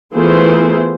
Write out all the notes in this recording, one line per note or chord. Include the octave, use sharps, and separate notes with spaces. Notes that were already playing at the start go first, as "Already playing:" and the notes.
E3 A3 B3 F4 G#4 C5